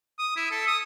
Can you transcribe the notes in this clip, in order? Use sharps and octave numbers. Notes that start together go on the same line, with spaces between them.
D#6
E4
A4
D#6